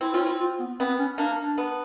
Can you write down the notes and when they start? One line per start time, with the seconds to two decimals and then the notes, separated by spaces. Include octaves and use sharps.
0.01 C4 E4
0.13 C#4 F4
0.21 E4
0.26 C4
0.40 F4
0.59 B3
0.80 B3 C4
0.99 C#4
1.18 A#3 D4
1.38 D4
1.58 B3